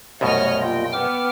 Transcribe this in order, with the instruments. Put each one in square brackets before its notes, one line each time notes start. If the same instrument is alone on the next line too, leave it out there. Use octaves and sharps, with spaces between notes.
[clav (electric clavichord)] C2 F#2 B2 [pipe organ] A3 [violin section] C#5 D#5 F6
[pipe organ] A#3 F4 D#5 [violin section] G5
[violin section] B3 [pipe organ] G5 D6 F6